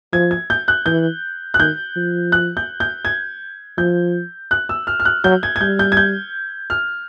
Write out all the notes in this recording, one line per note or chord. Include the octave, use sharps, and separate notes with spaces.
F3 G#6
G#6
G6
F#6
E3 G6
F#6
D#3 G6
F3
F#6
G6
G6
G#6
F3 G6
F#6
E6
F6
F6
F#6
F#3 G6
G#6
G#6
G3 G6
G6
G#6
G6
F6